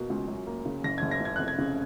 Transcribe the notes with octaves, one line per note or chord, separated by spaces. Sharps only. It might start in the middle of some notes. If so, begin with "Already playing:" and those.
Already playing: B2 A#3
C#2
F#2
A#3
C#3
F#1 A#6
F#1 G#6
A#6
C#3 G#6
F1 F#6
G#6
C#3